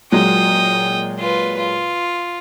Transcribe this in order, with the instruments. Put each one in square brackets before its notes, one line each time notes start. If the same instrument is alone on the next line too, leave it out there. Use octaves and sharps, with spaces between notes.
[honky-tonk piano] A#2 F#3 G#3 [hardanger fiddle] G5 D#6
[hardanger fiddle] F4 B4
F4